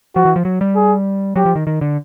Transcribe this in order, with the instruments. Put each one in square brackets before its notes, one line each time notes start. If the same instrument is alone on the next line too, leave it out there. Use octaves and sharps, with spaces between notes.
[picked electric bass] F3 [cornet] F#4
[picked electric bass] E3
F3
F#3
G3
[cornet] G#4
[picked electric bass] F#3 [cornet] G4
[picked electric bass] F3
D#3
D#3
D3